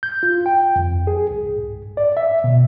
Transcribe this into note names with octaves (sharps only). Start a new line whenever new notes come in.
G6
F4
G5
F2
G#4
C2
G#2
D5
E5
B2